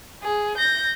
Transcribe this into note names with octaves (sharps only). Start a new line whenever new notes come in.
G#4
G6 A#6